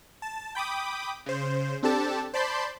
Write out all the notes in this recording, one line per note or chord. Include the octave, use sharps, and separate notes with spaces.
A5
G5 B5 D6 D#6
C#3 C5
C4 D4 G4 A4 A5
C5 D5 A5 B5 C6 G6